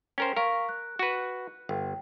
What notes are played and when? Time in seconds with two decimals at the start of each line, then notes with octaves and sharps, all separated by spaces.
0.18 C#4 A#4 C5 G5
0.37 A#4 F5 C#6 B6
0.69 F#6
0.99 F#4 B4
1.69 G1 G5